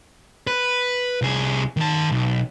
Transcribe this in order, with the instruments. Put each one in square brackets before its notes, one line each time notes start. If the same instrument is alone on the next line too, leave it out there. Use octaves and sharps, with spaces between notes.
[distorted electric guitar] B4
C2 G#4
D#3 A5
B1